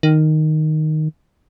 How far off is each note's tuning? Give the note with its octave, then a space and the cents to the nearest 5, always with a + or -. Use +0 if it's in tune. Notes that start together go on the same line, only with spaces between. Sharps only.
D#3 -5